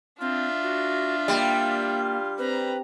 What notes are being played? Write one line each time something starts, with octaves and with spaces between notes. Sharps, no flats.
C4 D4 F4 E5
F#4
G3 A#3
C4 B4 A#5